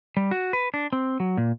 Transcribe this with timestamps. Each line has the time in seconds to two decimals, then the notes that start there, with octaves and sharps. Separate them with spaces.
0.17 G3
0.31 F#4
0.53 B4
0.74 D4
0.93 C4
1.20 F#3
1.38 A#2